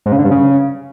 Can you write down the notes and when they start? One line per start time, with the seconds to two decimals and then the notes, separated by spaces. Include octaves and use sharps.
0.06 G#2
0.12 C#3
0.18 D3
0.25 G2
0.31 C#3